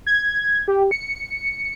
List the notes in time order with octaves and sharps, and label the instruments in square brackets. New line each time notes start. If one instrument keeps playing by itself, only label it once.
[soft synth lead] G#6
G4
C#7